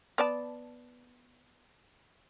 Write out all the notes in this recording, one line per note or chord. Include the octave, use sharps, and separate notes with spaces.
B3 D5 A5